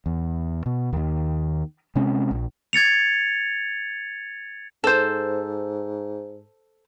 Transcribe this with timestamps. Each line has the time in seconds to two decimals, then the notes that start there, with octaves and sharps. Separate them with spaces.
0.06 E2
0.66 B2
0.93 D#2 D#3
1.96 C3 G#3 C4 C#4
2.31 A#1
2.73 G#6 A6 C#7 F7
4.84 G#2 A4 C5